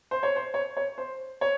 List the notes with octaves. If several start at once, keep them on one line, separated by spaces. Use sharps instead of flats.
C5
C#5
C5
C#5
C#5
C5
C#5